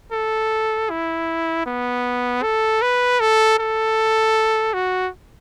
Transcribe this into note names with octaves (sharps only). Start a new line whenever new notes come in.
A4
E4
B3
A4
B4
A4
A4
F#4